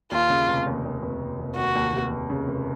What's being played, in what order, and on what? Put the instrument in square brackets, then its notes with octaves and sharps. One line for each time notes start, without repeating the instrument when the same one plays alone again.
[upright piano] D#2 [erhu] F4
[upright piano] C#3
F1
D#2
D#2
F1
F1
F1
[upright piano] D#2 [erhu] F#4
[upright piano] D#2
F1
F1
C#3
F1